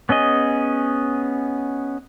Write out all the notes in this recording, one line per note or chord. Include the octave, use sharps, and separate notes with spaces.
B3 C#4 G#4 D#5